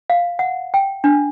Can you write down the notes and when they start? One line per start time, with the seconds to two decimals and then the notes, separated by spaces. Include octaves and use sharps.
0.10 F5
0.39 F#5
0.74 G5
1.04 D4